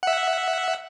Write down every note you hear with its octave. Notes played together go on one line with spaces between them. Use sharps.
E5 F#5